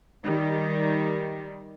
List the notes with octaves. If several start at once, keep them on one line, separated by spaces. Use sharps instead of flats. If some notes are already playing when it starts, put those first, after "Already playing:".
D#3 G3